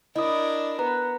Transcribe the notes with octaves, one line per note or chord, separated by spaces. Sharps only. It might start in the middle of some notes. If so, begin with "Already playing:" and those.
D4 E4 A#4 D#5 D#6
B3 B4 A#5